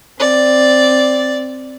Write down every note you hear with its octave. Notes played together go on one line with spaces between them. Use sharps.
C4 D5